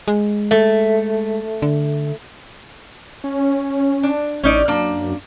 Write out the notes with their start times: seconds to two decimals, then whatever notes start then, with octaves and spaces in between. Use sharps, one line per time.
0.08 G#3
0.51 A3
1.62 D3
3.24 C#4
4.03 D4
4.43 A1 C#4 D#4 D5
4.68 F#2 A#3 D4